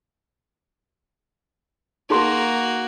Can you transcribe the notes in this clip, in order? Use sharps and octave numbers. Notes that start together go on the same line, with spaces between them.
A#3 D#4 F#4 G#4 C6